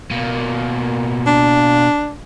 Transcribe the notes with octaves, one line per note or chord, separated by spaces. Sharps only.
B2 A#3
D4